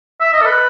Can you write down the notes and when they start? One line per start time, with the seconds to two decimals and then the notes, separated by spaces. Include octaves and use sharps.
0.20 E5
0.33 D#5
0.42 A4
0.46 B4